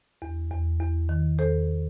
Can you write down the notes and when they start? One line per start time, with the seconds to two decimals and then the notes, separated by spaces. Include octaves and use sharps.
0.22 E2
0.51 E2
0.81 E2
1.09 D#3
1.39 E2 A4 C5